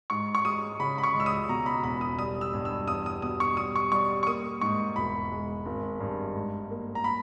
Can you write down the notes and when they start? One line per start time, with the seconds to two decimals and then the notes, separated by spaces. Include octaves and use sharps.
0.10 G#2 C#6
0.35 C#6
0.45 G#3 D#6
0.80 C#3 B5
0.98 B5
1.03 C#6
1.14 C#2
1.20 E6
1.26 D#6
1.49 B2 A#5
1.66 B5
1.83 E1 B5
2.01 D#6
2.18 G3 D#6
2.41 E6
2.53 G2
2.65 E6
2.88 E2 D#6
3.06 D#6
3.22 B2 D#6
3.40 C#6
3.57 G3 D#6
3.76 C#6
3.92 G3 C#6
4.23 C#6
4.27 A#3 D#6
4.61 G#2 C#6
4.96 E1 B5
5.32 G#3
5.65 G#1
6.00 G2
6.35 G#2
6.71 A#3
6.95 A#5
7.04 B5